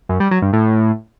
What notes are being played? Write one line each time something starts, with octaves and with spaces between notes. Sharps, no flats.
F#2
G3
F#3
G2
A2